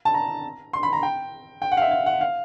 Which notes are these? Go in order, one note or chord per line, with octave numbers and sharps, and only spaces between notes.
A5
A#5
C6
B5
A#5
G5
G5
F#5
F5
E5
F5
F#5
F5